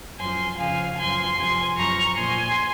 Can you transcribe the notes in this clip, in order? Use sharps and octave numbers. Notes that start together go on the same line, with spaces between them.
F#2 F3 G#5 C6
F2 C#3 F3 F5 G#5
F#2 F3 G#5 C6
F2 C3 F3 G#5 C6
F#2 F3 A#5 C#6
A#2 F3 G#5 C6